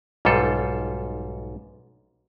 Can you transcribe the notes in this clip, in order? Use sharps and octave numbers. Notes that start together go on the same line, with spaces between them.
B1 G#2 G3 F4 A4